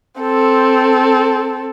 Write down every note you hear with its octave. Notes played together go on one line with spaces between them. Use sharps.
C4 A4